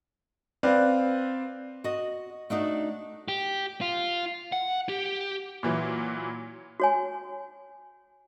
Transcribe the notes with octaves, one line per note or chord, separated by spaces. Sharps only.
C4 B4 D5 F5
F#4 D#5
A3 D4 D#4 F#4
G4
F4
F#5
G4
A#2 E3 F#3
F#4 C#5 G#5